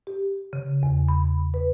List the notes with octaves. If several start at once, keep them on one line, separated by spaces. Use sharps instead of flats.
G4
C#3
E2
B5
B4